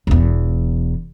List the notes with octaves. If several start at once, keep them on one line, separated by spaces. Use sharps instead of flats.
E1 E2